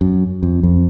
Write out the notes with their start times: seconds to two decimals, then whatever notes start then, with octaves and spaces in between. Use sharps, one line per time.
0.01 F#2
0.43 F2
0.63 F2